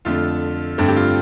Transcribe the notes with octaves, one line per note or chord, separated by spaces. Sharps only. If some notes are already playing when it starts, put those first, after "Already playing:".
F2 D3 A3 F4
G2 D3 A3 C4
G4
F4